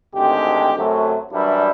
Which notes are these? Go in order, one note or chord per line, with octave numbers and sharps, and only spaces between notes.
G#1 D2 G#3 G4
F#2 C3 F#3 A3
F#2 E3 G3 D4 E4